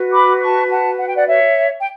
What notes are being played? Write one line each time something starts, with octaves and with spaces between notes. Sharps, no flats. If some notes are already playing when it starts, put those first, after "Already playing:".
Already playing: F#4 B4
B5 D6
A5 C#6
F#5 A5
F#5
G5
D5 F#5
C#5 E5
G5